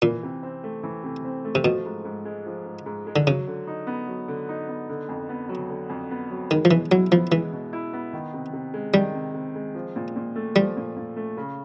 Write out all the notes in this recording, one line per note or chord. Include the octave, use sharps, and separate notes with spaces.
A#2 E3
C3
C4
A3
E3
C3
C4
A3
C3
B2 F3
G#2
G#2
G#3
F3
G#2
G#2
G#3
D3
C#3 F#3
D3
D#4
B3
F#3
D3
D#4
B3
D3
F2
B3
F#3
D3
F2
B3
F#3
D#3 G#3
F3
B2 E3
F#3 E4
F3 B3
E3 G#3
B2
E4
B3
D#3
C3
C3
G#3
D#3 G3
C3
C3
G#3
F3
A#2
A#2
A3
F3 G3
A#2
A#2
A3
C#3